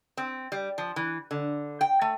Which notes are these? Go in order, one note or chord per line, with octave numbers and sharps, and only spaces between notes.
C4
G3
F3
E3
D3
G5
A3